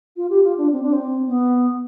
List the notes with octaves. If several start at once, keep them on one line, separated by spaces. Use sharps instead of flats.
F4
G4
F4
D4
C4
D4
C4
B3